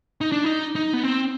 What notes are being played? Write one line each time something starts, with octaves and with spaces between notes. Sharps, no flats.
D#4
D4
D#4
D#4
B3
C4